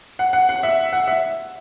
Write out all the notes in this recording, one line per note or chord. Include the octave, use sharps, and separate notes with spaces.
F#5
F#5
F#5
E5
F#5
E5